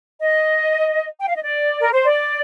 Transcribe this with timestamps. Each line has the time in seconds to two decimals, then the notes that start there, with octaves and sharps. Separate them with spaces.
0.21 D#5
1.20 G5
1.28 F5
1.36 D#5
1.44 D5
1.81 A#4
1.93 C5
2.05 D5